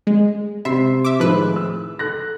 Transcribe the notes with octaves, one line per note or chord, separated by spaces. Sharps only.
G#3
C3 E5 C6 C7
E5 D6
A2 D#3 F3 G#3 B4
E6
A4 F#6 A#6